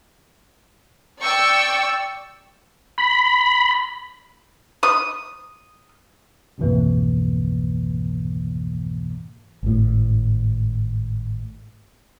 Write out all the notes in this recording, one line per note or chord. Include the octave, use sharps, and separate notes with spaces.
D5 G5 C#6 E6
B5
D#6
B1 F2 G#2 B2 E3 A#3
G#1 A2